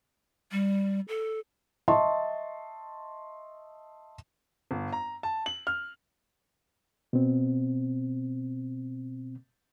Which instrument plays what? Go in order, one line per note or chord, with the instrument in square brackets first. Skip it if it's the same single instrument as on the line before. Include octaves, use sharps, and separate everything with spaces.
[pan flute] G3
A4
[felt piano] D#5 E5 A5 C6 C#6
[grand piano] G1
A#5
A5
F#7
F6
[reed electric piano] B2 C4